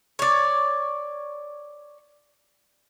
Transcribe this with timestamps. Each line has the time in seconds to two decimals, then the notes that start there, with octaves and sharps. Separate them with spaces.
0.19 C#5 D5